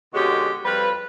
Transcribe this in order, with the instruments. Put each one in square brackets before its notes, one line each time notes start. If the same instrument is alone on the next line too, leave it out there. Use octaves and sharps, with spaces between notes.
[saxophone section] B2 D3 G#3 C#4 F#4 G4
F2 G3 F4 B4